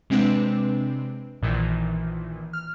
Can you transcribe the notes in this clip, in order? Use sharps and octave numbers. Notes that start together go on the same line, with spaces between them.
C3 G#3 C4 D4 B4
A#1 A#2 D#3 E3
F6